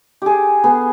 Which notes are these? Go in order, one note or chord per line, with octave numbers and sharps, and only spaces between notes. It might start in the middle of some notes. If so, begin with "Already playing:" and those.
G4 G#4
B3 G#4